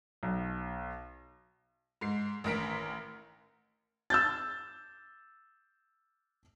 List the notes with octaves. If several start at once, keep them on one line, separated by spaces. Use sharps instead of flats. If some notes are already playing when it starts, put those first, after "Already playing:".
B1
G#2 C7
A1 D#3 A#4 F6 B6 D7
E6 G6 A6